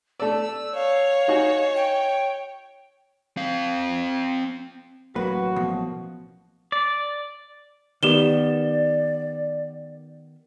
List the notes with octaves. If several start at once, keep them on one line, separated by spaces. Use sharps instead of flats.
A3 D5 E6
C#5 F5
D#4 F#4 G#5
G5
C4 F5
A1 F#3 A#3 F#4 B4
B2 F3
D5
D#3 B3 G4 D5 E7 G7